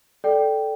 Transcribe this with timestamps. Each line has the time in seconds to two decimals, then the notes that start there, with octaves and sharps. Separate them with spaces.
0.24 A4 D5 G5